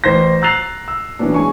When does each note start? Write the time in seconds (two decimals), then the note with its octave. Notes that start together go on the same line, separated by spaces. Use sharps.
0.04 A1 C5 A#6
0.42 A#5 E6 F#6 A6 C7 F7
0.88 E6
1.19 E3 F#3 B3 C#4 D4
1.34 G#3 G#5 C#6